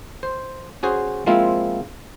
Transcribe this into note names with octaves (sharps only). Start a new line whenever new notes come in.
C5
C#4 F#4 G#4 C5
F3 G#3 A#3 C4 E4 F4